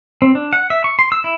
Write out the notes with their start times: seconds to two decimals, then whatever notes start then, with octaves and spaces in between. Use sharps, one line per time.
0.22 C4
0.35 D4
0.53 F#5
0.70 E5
0.84 C#6
0.99 C6
1.12 E6
1.24 E4